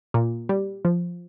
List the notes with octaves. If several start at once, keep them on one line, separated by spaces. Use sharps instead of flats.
A#2
G3
F3